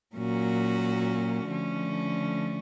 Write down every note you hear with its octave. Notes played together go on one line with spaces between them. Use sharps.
A#2 F#3 A#3 C#4 F#4
D3 F3 A3 C#4